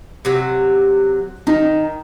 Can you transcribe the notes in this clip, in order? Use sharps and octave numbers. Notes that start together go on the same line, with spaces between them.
C3 F#3
D#3 D#4